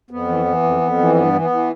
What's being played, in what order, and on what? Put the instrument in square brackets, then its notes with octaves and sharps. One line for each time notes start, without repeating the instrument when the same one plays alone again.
[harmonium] F2 B3
E3
E3
F2
F2
E3
G2 B3
E3
B3
E3